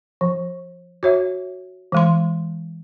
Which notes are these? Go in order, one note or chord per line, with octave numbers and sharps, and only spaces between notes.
F3
F#4 C#5 E5
E3 G#3 C6